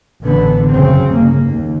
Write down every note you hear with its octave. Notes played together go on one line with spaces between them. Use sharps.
A1 D3 B3
F#2 C#3 C4
G1 A#3
D#2